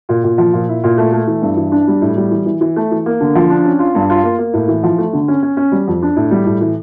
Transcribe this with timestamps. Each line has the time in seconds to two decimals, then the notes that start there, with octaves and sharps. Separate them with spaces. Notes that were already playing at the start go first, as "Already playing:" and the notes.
0.09 A#2
0.24 A#2
0.38 F3
0.53 A#2
0.69 E4
0.84 A#2
0.98 A3
1.12 A3
1.27 E3
1.42 G2
1.57 E3
1.72 D4
1.87 G3
2.02 A2
2.17 G3
2.31 E3
2.46 E3
2.61 E3
2.76 A3
2.91 E3
3.06 A#3
3.20 D3
3.35 F3
3.50 D4
3.65 C#4
3.79 F4
3.95 G2
4.10 F4
4.24 A#3
4.38 A#3
4.53 A2
4.68 E3
4.83 F3
4.98 A3
5.13 D3
5.28 C#4
5.43 C#4
5.57 C#4
5.72 G3
5.87 F2
6.02 D4
6.16 A2
6.31 G3
6.46 A2
6.61 E3